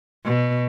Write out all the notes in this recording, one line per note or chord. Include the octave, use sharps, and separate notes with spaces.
B2